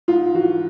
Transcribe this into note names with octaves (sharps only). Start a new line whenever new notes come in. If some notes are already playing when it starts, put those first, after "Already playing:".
G#2 F4
E3 F#4